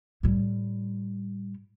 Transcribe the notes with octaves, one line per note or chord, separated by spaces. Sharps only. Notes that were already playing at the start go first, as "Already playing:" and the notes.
A2 G3